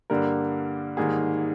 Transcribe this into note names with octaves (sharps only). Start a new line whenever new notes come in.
G2 D3 G3 A#3 A#4
G#2 D#3 G3 A#3 G#4